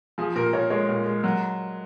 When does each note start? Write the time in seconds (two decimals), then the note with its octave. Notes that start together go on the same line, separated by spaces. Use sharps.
0.18 F3 G#4
0.36 A#2 A#4
0.53 A#2 C#5
0.70 G#3 C#5
0.89 A#2
1.06 G#3
1.24 F#3